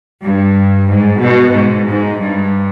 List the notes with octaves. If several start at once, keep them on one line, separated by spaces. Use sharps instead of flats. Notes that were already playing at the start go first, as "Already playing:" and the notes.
G2
G#2
B2
G#2
G#2
G2